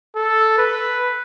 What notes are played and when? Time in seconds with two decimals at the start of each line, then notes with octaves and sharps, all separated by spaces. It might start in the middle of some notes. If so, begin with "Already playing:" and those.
0.16 A4
0.58 B4